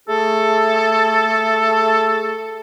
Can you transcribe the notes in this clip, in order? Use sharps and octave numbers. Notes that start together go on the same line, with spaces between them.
A3 G#4 A4